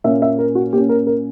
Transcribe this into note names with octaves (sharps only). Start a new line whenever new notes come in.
A#2 A#3 C#4 E5
E5
A#4
F#4
A#2 A#3 C#4 G4
A#4
A#4